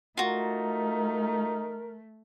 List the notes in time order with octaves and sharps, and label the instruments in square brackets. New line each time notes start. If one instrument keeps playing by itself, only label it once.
[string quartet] A3 [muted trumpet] D#4 [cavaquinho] F4 F#4 [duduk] A#4